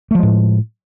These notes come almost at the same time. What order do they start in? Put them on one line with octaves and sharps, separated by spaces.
A3 F3 G#3 A2